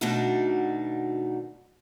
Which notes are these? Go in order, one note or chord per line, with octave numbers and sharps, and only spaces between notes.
B2 D#3 A3 D4 D#4 F#4